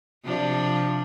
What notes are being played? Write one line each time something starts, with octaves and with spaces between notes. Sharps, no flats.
C3 F3 D4